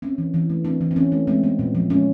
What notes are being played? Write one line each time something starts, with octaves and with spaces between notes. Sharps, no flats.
C4 C#4
E3
E3
A3
C4 D4
E3
C4
E3 C#4
A3
G#3 C4
B3
A#2
F3
G#3 C#4